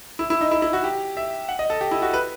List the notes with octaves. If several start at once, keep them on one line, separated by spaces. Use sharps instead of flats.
E4
E4
D#4
E4
E4
F#4
G4
E5
F#5
D#5
A4
G4
E4
F#4
B4